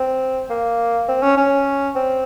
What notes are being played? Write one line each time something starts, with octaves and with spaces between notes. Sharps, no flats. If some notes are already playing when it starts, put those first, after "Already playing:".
Already playing: C4
A#3
C4
C#4
C#4
C4